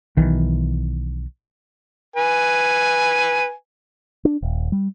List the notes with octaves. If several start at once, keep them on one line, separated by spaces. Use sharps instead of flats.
B1 D#3 E3
B4 G#5
D4
D#1
G3